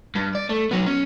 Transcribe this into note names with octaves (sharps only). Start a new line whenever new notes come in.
G2
D5
A3
F#3 B3
C#4